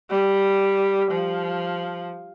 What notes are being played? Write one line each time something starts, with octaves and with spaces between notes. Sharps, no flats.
G3
F3